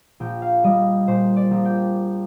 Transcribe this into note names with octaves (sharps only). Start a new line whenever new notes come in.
A#1 G5
F5
G3 D#5
A#2 C5
D5
A#1
G5